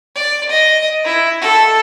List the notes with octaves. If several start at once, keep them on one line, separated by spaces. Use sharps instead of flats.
D5
D#5
E4
A4